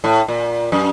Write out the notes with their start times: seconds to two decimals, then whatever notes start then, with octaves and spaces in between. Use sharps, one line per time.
0.04 A2
0.28 A#2
0.72 F#2